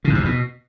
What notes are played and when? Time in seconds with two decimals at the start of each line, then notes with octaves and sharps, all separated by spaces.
0.05 C#3
0.10 G#2
0.15 C3
0.20 E2
0.25 B2